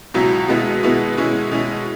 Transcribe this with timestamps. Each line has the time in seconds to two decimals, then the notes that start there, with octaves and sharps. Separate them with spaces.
0.14 C#2 B2 F#3 C#4 E4
0.48 B2 G#3 B3 E4
0.83 B2 G#3 B3 E4
1.17 B2 G#3 C#4 E4
1.51 B2 G#3 C#4 E4